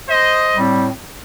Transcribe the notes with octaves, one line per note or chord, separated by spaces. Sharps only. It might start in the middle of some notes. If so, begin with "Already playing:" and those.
C5 D#5
A2 G3 C4